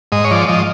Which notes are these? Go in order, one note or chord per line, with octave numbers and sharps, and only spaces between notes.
G#2 D#5
C#5
F3 D5
F3 D#5